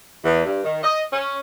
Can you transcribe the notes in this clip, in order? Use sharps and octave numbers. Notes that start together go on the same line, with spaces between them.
E2
G2
D#3
D#5
C#4